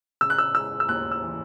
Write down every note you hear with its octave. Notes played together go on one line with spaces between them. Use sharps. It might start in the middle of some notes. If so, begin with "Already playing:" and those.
C#3 E6
F#6
E6
G#3 E6
E6
D#2 F#6
E6
E3